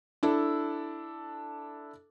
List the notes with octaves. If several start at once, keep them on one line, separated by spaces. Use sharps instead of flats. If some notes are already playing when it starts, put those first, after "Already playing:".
D4 E4 A4